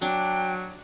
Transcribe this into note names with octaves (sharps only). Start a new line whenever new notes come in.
F#3 D4 G5